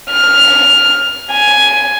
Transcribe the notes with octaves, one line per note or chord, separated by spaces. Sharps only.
F6
G#5